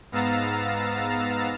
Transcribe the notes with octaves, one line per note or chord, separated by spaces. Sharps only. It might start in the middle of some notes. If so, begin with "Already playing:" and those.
G#2 B3 F5 A#5 E6 A6